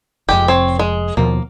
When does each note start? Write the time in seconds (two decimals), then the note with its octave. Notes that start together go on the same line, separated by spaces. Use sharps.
0.29 F1 F2 G#3 G4
0.48 C4 C#5
0.79 G#3
1.17 D#2 B2 F3 A#3